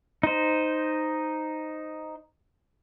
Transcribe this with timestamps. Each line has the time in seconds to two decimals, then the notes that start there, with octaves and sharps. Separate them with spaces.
0.23 D#4 C5